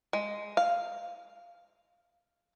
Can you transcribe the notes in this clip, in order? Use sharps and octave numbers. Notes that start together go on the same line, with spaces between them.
G#3
F5